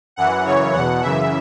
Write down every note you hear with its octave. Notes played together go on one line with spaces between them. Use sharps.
F#2 E3 F#5
F#2 C#3 E3 C#5
E2 B2 F#5
F#2 C#3 E3 E5